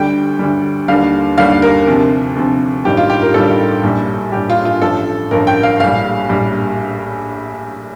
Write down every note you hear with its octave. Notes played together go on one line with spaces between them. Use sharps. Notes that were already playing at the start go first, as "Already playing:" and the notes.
Already playing: D2 D3 G3 G5
D2 D3 G3
D#2 D3 G3 F5
D#2 D3 G3 F5
A#4
D2 C3 F3
D2 C3 F3
A1 G2 D#3 G3 G4
F4
G4
A#4
A1 G2 D#3 G3 A4
A#1 A2 G3
A#1 A2 G3 G4
F4
F4
A1 G2 F3 A4
A1 G2 F3 A#4
G5
F5
A#1 A2 G3 F5
A#1 A2 G3